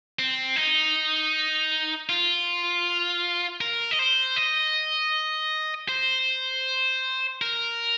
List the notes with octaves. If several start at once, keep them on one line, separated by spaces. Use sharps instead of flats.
C4
D#4
F4
A#4
D#5
C5
D#5
C5
A#4